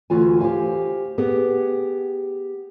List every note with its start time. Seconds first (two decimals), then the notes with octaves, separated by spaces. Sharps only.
0.10 D2 E3 F4 F#4 G#5
0.40 G4 C5 D5 F5 G#5
1.18 B3 G4 G#4 F#5